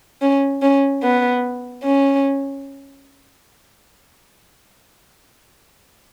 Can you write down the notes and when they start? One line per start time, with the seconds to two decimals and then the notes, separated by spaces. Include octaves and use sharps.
0.22 C#4
0.62 C#4
1.03 B3
1.84 C#4